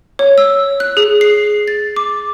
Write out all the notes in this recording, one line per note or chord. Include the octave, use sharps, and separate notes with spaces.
C#5
E6
F#6
G#4
C7
A6
D6